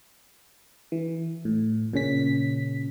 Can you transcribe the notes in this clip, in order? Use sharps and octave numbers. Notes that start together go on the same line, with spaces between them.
E3
A2
A#2 C#3 C#4 B6